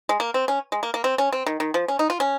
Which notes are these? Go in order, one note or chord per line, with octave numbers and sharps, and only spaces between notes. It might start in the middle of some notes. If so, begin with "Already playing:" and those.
G#3
A#3
C4
C#4
G#3
A#3
A#3
C4
C#4
C4
D#3
D#3
F3
C#4
D#4
F4
C#4